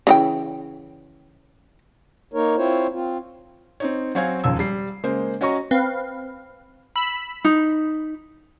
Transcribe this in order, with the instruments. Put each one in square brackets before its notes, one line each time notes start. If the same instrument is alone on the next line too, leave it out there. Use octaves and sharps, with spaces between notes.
[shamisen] C#3 E3 G5
[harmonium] A#3 D#4 A#4 C#5
C4 E4 F4 C5 C#5
C4 F4
[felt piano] C4 D#4 C#5
F#3 C4 C#5 F5 G#5 G#6
E1 D#2 C#3 F3 E6
G3 C7
C#3 G#3 A#3 C5
C#4 F#4 C#5 D#5 A#5 C#6
[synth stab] C4 B4 F5
B5 E6
[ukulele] D#4